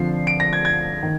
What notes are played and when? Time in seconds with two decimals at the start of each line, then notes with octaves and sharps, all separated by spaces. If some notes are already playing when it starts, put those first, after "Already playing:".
Already playing: D3 F3 C4 F4 C7
0.27 D7
0.40 A#6
0.53 G#6
0.65 G#6
1.03 D#3